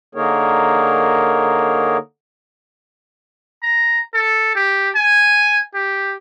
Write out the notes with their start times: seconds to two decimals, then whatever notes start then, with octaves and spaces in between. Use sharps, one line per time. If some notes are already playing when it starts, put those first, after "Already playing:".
0.15 D3 A#3 D#4 G#4 A#4 C#5
3.63 A#5
4.14 A4
4.55 G4
4.95 G#5
5.74 G4